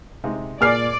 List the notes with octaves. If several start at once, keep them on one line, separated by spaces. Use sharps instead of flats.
C3 G#3 D#4
A#2 G#4 A#4 D5 G#5 F6 C7